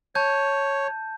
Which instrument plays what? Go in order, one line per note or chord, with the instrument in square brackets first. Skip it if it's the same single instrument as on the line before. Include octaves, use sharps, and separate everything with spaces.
[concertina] C#5 [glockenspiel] A5 G6